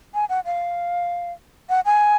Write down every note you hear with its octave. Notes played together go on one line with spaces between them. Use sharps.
G#5
F#5
F5
F#5
G#5